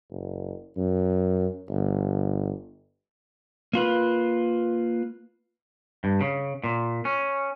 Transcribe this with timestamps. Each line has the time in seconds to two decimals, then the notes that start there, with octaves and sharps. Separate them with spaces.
0.11 F#1
0.77 F#2
1.70 G1
3.73 A#3 F4 B4
6.04 G2
6.21 C#3
6.64 A#2
7.05 C#4